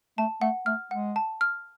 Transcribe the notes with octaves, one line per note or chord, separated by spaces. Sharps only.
A3 A5
A3 F#5
A3 F6
G#3 F#5
A5
F6